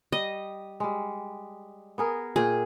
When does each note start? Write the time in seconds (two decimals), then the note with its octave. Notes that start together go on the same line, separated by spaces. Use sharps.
0.12 G3 D#5
0.80 G3 G#3
1.98 B3 G#4 A#4
2.36 A#2 G#4 G5